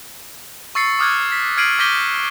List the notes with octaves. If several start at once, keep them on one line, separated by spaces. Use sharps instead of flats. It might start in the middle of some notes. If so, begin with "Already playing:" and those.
C#6 E6 A6 C7 C#7
D6 D#6 F6 F#6 G#6
B6
F6 G#6 C7 D7 D#7 F#7
D6 G6 A#6 B6 D#7 G7